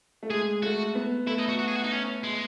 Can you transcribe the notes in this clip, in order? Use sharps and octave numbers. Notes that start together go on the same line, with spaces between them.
A3
G#3 G#4
A3 F#4
B3
A3 E4
D#4
F#4
F#4
G#4
F#4
D#4
C#4
G#3